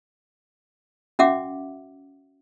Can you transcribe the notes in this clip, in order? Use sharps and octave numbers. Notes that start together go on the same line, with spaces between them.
C#4 F#4 E5 F#5 D6